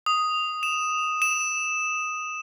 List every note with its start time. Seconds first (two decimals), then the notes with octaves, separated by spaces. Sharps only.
0.06 D#6
0.63 E7
1.22 E7